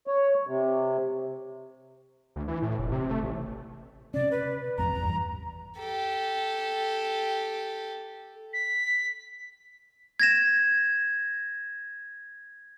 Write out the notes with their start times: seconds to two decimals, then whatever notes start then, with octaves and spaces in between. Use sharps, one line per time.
0.07 C#5
0.47 C3
2.36 D2
2.48 E3
2.62 A2
2.79 F1
2.92 C3
3.11 A3
3.23 A1
4.14 C3 C#4 D5
4.31 B4
4.78 G#1 F2 A#5
4.96 E2 G2
5.78 G4 A4
8.53 B6
10.20 G#6 A#6 E7